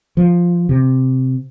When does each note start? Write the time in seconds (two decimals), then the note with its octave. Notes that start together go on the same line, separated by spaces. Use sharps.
0.17 F3
0.69 C3